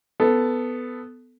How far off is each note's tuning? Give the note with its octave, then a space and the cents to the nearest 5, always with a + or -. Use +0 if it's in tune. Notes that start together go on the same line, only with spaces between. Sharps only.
B3 +10 A4 +0